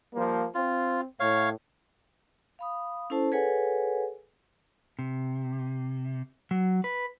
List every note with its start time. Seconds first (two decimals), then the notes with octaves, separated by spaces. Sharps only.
0.14 F3 G3 A#3
0.55 C4 F4
1.20 A2 C#5 F5
2.59 F5 B5 D#6
3.10 C#4 E4 A4 C5 A5
3.32 G#4 A4 B4 C#5 F#5 G#5
4.99 C3
6.51 F#3
6.84 B4